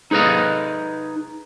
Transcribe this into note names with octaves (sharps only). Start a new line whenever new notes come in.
D#4 G#4 B4 D#5 F5